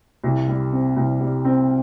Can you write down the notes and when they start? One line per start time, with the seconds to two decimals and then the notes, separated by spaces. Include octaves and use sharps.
0.24 C2
0.48 G3
0.72 C4
0.97 C2
1.20 G3
1.45 C4